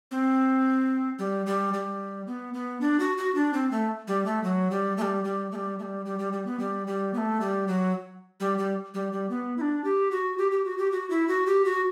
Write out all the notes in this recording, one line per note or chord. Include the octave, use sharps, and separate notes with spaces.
C4
G3
G3
G3
B3
B3
D4
F#4
F#4
D4
C4
A3
G3
A3
F#3
G3
A3
G3
G3
A3
G3
A3
G3
G3
G3
G3
B3
G3
G3
B3
A3
G3
F#3
G3
G3
G3
G3
B3
E4
D4
G4
F#4
G4
G4
F#4
G4
F#4
E4
F#4
G4
F#4